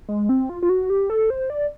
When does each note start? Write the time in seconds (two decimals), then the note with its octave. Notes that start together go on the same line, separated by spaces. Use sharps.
0.09 G#3
0.29 C4
0.49 F4
0.63 F4
0.69 F#4
0.90 G4
1.10 A4
1.30 C5
1.50 D5